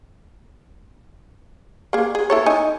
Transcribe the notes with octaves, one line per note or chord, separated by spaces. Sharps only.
A#3 G#4
G#4
E4 A4 C#5
D#4 G#5